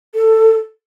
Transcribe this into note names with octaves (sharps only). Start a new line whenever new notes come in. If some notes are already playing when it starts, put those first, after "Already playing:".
A4